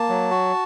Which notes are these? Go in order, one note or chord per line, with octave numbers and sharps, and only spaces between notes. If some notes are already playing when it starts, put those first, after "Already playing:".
Already playing: A#3 A5
F#3
F#4